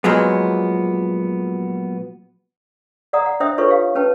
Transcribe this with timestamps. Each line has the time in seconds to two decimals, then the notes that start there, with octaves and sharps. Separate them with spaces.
0.04 A#2 F3 F#3 G#3 B3
3.13 D5 F#5 A#5 D#6
3.26 F#5
3.40 D4 C5 E5 G5 D#6
3.58 D#4 F4 A4 B4 C#5 C#6
3.69 G4 F5
3.95 C#4 B4 G5 A5